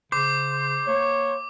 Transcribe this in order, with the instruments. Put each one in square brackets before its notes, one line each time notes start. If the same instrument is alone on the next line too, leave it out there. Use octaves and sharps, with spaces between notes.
[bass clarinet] C#3 [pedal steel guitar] C5 [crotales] D6
[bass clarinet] A#3 [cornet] C#5